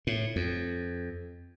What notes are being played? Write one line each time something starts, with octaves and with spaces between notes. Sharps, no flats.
A2
F2